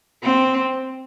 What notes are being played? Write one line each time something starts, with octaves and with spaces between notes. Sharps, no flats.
C4